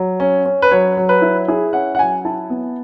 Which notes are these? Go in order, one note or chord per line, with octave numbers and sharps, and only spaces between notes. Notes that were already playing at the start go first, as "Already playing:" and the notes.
Already playing: F#3
C#4
C#4
B4
F#3 C#5
F#3
B4
E4
E4 G#4
C#4 F#5
F#5
F#3 G#5
E4 A5
B3